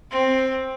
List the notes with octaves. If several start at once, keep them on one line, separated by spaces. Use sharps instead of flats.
C4